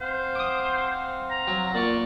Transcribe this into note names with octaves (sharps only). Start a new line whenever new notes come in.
C4 C5 F5 F#5
D6 D#6
A#5
F#3
A#2 D5 C#6